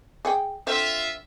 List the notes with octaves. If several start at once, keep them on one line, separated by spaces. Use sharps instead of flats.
G#4 F#5 G5
D3 C4 F4 C5 E5